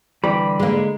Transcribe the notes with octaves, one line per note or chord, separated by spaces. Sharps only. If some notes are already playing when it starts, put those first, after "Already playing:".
D3 E3 G3 B5
G#3 A#3